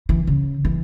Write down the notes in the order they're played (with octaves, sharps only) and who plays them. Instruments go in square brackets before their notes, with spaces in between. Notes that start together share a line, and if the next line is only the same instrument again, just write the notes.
[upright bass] E3
C#3
E3